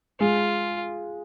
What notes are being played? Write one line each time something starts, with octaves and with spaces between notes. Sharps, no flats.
G#3 F4